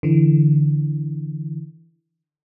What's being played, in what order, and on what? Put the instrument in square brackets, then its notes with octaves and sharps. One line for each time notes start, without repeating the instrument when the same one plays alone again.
[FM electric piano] D3 E3